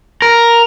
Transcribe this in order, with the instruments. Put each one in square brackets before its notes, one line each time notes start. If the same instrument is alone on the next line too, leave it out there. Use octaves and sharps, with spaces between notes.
[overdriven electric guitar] A#4